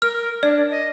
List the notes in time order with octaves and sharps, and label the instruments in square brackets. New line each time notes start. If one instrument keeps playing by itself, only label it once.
[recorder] A#4 [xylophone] F6
[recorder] D4 [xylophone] D5
[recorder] D#5